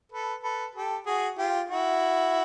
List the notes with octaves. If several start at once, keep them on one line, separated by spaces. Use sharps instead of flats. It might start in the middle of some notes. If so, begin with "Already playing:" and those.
A4 B4
A4 B4
G4 A4
F#4 G#4
F4 G4
E4 F#4